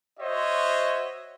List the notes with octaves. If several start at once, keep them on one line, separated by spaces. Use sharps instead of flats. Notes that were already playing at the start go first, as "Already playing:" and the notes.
F#4 C5 C#5 D#5 E5